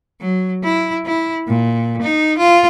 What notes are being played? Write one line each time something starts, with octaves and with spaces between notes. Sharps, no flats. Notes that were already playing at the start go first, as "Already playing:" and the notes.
F#3
E4
E4
A#2
D#4
F4